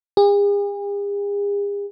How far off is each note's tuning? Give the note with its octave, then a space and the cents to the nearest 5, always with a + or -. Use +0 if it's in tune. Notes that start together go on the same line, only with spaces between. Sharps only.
G#4 -45